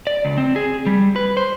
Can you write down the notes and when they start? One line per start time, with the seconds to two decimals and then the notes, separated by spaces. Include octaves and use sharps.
0.07 D5
0.25 C#2
0.37 C4
0.56 G#4
0.86 G3
1.16 B4
1.37 C5